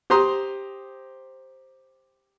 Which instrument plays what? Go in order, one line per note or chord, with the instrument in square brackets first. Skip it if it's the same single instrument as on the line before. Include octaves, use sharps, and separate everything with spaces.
[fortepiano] G4 C5 A#5 C6 D#6